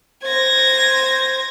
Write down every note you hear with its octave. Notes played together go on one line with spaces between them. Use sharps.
C5 G#6 A#6